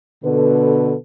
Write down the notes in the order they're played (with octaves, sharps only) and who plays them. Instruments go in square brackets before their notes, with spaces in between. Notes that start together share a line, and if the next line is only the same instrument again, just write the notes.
[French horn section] B2 D3 A4 B4